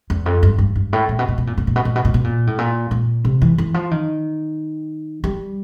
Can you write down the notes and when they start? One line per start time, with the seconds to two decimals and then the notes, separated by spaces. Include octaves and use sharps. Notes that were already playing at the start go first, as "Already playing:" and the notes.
0.10 E2
0.26 F2
0.43 G2
0.58 G2
0.75 G2
0.93 A2
1.09 A#2
1.19 B2
1.28 A#2
1.38 B2
1.47 A#2
1.58 B2
1.67 A#2
1.76 B2
1.85 A#2
1.95 B2
2.05 A#2
2.14 B2
2.24 A#2
2.47 A2
2.58 A#2
2.91 A#2
3.25 C3
3.42 E3
3.58 E3
3.74 F3
3.91 D#3
5.24 G3